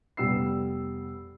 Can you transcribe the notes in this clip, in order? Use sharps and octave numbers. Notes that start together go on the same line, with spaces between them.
F1 G3 B3 E6 C7